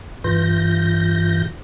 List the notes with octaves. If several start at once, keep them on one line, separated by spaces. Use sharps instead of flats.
G2 E3 F4 G6 A#6